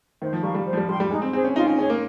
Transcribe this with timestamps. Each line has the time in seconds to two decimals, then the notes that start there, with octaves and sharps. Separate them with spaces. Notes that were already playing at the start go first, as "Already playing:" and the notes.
0.21 D#3 C5
0.33 F3
0.43 G3 F5 A#5 C#6
0.55 G3
0.66 C5
0.73 F3
0.77 G3
0.88 G3 C6
0.93 G5
1.00 G3
1.11 G#3 D#4
1.22 C4
1.33 C4 G#4 C5
1.44 C#4
1.56 D#4 F4
1.66 C#4
1.78 C#4 G#4 C#5
1.90 A#3